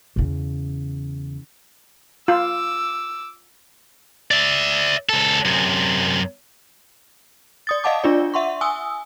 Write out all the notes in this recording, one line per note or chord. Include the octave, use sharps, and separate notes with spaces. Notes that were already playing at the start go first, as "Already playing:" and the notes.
E2 C#3
F4 D6 E6
D5 E5
C#2 A4
F#2 C3
D5 D#6 A6
D#5 F5 F#5 A5 D6
D4 F4 D5
E5 F#5 C6 C#6
G#5 D#6 E6